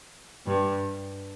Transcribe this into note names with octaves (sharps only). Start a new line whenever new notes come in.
G2